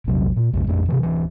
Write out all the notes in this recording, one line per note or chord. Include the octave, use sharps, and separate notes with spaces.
A#1 E2 C3 F#3
A#2
A#1 F2 G#2 C#3
A1 F2 A3 D4
C3 D#3 E3
D1 E3